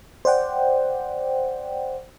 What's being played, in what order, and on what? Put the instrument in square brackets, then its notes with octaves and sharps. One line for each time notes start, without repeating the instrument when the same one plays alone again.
[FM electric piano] C5 D5 F#5 G5